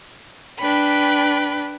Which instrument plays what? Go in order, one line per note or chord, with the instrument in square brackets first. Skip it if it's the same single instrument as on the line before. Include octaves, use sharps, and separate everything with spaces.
[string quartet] D4 B4 G5 B5